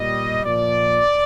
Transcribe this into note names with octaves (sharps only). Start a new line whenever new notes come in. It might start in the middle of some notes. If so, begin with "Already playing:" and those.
Already playing: A#2 G3 D#5
A#2 F3 D5